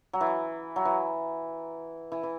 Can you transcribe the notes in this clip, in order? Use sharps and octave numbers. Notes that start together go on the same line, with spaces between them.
F#3
E3
F#3
E3
E3
E3